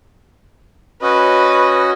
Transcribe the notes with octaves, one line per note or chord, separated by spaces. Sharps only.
C#4 F#4 B4 D#5